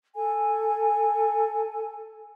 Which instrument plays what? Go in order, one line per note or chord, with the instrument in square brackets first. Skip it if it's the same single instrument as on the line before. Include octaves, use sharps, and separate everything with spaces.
[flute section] A4 G#5